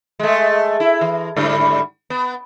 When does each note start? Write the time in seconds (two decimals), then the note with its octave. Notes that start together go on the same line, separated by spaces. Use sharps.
0.19 G#3 A3
0.80 E4
1.01 E3
1.37 G#2 D3 G3
2.10 B3